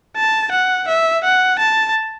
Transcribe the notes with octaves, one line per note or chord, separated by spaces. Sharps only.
A5
F#5
E5
F#5
A5